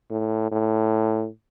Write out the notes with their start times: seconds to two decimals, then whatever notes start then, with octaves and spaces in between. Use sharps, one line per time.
0.11 A2
0.52 A2